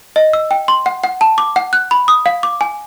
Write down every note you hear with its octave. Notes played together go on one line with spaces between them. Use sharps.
D#5
E6
G5
C6
F#5
F#5
A5
D6
F#5
F#6
B5
D#6
F5
D6
G#5